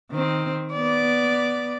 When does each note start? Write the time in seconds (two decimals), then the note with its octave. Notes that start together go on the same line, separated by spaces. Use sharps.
0.11 D#3 C4
0.73 B3 D5